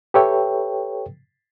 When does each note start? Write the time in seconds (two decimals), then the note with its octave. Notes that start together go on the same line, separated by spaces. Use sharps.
0.14 G4 A4 B4 C#5 E5 G5